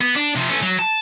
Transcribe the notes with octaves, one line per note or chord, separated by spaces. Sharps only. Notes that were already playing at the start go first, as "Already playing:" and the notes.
B3
D4
C3 F3
A3 C#4
F#3
A5